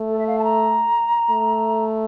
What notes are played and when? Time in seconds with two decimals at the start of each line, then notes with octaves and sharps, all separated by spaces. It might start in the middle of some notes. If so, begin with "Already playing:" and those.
Already playing: A3
0.10 A4
0.19 E5
0.27 F5
0.39 A5
0.44 A#5
1.30 A3